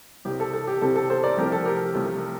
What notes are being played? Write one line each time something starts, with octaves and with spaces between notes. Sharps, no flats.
C2 C3 G3 C4 G4
A4
A4
G4
C2 C3 G3 C4 A4
A4
A4 C5
A#4 D5
C2 C3 F3 A3 G4 A#4
A4
G4 A#4
C2 C3 F3 A3